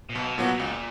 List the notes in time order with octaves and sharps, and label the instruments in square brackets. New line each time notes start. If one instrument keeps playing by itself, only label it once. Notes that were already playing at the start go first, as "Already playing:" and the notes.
[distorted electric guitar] A#2
[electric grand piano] B1 [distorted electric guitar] B2
[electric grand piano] A#2 F#3 B3 F#4
[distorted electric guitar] B2
[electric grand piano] C#2 [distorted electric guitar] A#2